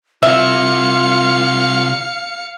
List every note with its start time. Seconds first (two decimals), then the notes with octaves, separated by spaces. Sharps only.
0.23 C3 E4 F4 E5 F5 C#7